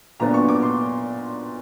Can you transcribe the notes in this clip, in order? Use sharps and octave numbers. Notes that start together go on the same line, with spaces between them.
A#2 F#3 B3 D4 A#5
C#6
D6
C6